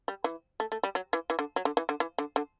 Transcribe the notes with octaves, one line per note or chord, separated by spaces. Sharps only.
G3
E3
A3
A3
G3
F#3
E3
E3
D3
F#3
D3
E3
D3
E3
D3
D3